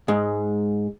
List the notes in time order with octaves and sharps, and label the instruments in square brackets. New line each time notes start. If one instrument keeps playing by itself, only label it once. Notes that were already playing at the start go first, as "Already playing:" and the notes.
[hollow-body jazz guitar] G#2 G#3